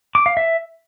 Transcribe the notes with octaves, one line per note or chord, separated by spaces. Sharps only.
D6
F5
E5